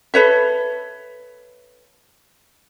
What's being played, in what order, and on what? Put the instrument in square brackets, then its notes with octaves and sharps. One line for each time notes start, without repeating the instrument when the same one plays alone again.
[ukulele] A4 B4 C#5 E5